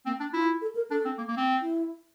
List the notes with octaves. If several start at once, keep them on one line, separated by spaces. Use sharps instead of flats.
A#3 C4
D4
E4 F4
A4
A#4
D4 A4
C4
A#3
A#3
C4
E4